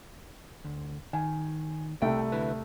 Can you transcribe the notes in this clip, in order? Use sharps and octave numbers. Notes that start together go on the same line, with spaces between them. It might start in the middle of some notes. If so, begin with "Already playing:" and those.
D2
D#3 G#5
C2 A3 G5
D3 E4 B4